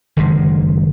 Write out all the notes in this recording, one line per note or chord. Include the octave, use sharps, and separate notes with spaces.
F#1 D3 D#3 G#3